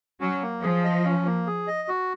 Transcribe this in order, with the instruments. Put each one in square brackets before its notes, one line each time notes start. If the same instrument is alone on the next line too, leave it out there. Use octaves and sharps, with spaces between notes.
[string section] F#3 [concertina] C#4
[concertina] A#3
[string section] F3 [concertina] G#4
[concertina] D#5
C#4
A#3
G#4
D#5
F#4